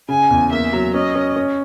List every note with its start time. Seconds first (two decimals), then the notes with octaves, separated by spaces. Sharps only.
0.09 C#3 G#5
0.31 E2
0.51 A#3 E5
0.73 F#3
0.94 C#4 D#5
1.15 C#4
1.36 C#4